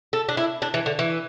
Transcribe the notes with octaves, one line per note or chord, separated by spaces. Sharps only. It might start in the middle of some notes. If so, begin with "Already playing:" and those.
A4
D4
E4
D4
E3
D3
E3